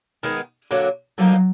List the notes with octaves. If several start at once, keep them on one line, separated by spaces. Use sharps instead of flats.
D#3 G#3 B3
D3 F#3 A#3
D3 F3 F#3 A#3 D#4